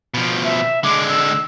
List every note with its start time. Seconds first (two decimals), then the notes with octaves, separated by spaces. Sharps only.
0.14 B2 F3
0.45 E5
0.84 D3 G#3 D6
1.09 E6